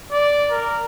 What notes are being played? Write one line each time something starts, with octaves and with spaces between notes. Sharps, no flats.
D5
A#4